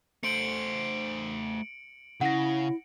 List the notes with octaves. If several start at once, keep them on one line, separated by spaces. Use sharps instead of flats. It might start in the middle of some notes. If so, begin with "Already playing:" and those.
A3 C5 C#7 D7 F#7
C#3 E4 F#5 A#6